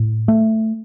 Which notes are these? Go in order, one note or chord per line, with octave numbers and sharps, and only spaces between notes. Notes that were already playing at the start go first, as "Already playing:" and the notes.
Already playing: A2
A3